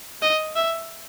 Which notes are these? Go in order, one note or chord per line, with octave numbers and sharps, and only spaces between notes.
D#5
E5